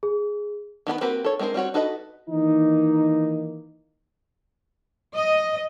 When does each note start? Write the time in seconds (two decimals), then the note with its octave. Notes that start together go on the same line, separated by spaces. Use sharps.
0.03 G#4
0.87 D#3 B3 D4 B4
1.01 A#3 C4 F#4 G4 B4
1.24 A4 C#5
1.39 G#3 C4 D4 A#4 C5
1.54 G3 C4 F#4 C#5
1.74 D#4 F#4 A4 B4 D#5
2.29 D#3 E3 A#3 D#4
5.14 D#5